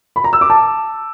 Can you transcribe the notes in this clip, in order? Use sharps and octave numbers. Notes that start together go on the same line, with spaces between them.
B5
A#5
E6
D6
A5